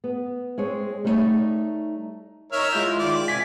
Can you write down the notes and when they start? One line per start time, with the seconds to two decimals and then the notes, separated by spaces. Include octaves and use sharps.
0.04 B3
0.58 G#3 C4 C#5
1.04 G3 A3 D#4 A4 C#5 D5
2.52 D#4 A#4 C#5 E5 F6
2.73 G#3 E4 F4 G6
2.99 D#3 F4 D5
3.28 C3 G#5 B6